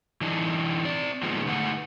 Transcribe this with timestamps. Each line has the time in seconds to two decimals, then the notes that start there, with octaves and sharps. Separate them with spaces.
0.21 E3 D4 D#4
0.85 C4 D5
1.22 A#2 D#3 F3 G#3 B3
1.46 D3 A3 D#4 B4 F#5